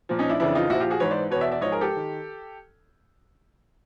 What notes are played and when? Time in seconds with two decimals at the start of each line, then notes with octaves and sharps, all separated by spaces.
0.09 A#2 F3
0.19 C#4 D#4
0.29 D4 E4
0.40 F2 C#3 E3 D4 E4
0.55 D#4 F4
0.70 A#2 F3 E4 F#4
0.80 F4 G4
0.90 F#4 G#4
1.00 G#2 E3 B4 C#5
1.11 C5 D5
1.30 E2 B2 B4 C#5
1.41 D5 E5
1.51 D5 E5
1.61 G#2 F3 C#5 D#5
1.72 G#4 A#4
1.81 G4 A4
1.96 D#3